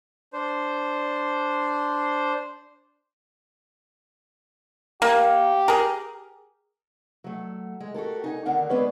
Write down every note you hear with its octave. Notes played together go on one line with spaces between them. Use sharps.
D4 C5
A#3 G4
G#4 A#4
F#3 A3
G#3
F#4 G4 A4 A#4
D#4 G#5
D#2 D3 D4 A#4 F#5
F#2 G#3 B3 D4 B4 C#5